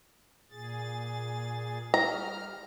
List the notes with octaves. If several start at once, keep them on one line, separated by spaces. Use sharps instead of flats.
A#2 G#4 A6
G3 A#5 F6